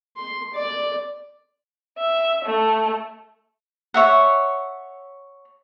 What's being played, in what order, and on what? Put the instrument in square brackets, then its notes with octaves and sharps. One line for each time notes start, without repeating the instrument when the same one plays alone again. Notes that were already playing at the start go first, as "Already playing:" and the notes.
[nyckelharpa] C6
D5
[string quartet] E5
A3
[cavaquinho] C#5 E5 F#5